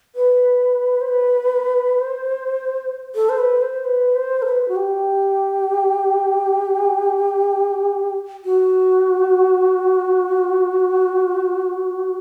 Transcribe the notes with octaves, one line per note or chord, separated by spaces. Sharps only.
B4
C5
B4
C5
A4
C5
B4
C5
B4
C5
A4
B4
F#4
G4
F#4